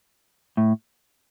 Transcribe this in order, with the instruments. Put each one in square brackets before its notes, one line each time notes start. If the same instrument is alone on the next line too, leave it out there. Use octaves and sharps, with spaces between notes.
[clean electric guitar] A2